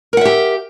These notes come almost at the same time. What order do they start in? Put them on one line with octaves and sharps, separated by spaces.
A#4 F#5 E5 G4